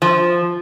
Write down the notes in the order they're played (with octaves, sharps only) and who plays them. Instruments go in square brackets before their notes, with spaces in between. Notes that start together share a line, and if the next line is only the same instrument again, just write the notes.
[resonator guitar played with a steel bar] F3